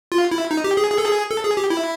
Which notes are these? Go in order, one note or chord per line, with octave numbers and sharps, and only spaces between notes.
F4
E4
D#4
G4
G#4
G#4
A4
G#4
A4
G#4
G4
E4